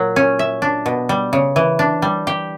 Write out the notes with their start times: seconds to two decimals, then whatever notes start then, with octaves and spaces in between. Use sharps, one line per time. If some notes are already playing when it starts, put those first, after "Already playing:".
Already playing: A#2 F#3 A#3
0.16 C#4
0.39 E5
0.62 D4
0.86 B2
1.09 G3
1.33 C#3
1.56 E3
1.79 D4
2.02 G3
2.27 G4